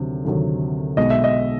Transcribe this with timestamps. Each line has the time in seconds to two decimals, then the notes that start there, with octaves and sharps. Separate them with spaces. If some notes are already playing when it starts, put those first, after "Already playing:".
Already playing: D2 C3 D#3 F#3
0.25 D2 C3 D#3 F#3
0.97 B1 B2 G#3 D#5
1.10 E5
1.24 D#5